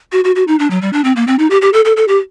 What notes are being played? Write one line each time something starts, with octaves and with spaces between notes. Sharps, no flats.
F#4
F#4
F#4
D#4
D4
F#3
G3
D4
C4
A#3
C4
D#4
G4
G4
A4
A4
A4
G4